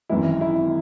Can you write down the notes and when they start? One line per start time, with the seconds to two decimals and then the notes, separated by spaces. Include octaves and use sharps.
0.09 G#1 F#2 E3 E4
0.41 E4